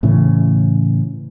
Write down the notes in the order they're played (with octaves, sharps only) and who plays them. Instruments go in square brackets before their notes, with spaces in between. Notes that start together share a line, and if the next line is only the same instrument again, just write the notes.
[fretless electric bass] A2 C#3 E3